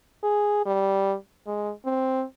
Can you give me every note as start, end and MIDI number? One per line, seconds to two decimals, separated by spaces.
0.23 0.64 68
0.65 1.15 55
1.47 1.71 56
1.85 2.24 60